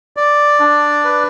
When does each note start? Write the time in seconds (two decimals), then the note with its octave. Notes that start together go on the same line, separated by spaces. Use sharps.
0.17 D5
0.60 D4
1.05 B4